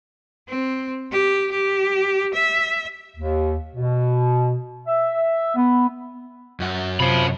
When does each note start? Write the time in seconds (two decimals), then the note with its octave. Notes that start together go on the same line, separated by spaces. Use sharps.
0.48 C4
1.12 G4
1.51 G4
2.34 E5
3.17 D#2
3.75 B2
4.87 E5
5.56 B3
6.60 F#2 F#4
7.00 C3 F3 C#5 B5